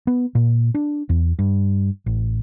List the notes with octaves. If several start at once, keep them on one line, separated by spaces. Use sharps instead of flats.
B3
A#2
D4
E2
G2
A1